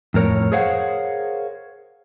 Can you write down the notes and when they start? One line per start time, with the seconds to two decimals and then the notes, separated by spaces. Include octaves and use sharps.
0.14 F2 A2 A#4 C#5
0.52 G#4 A#4 C5 C#5 F5 F#5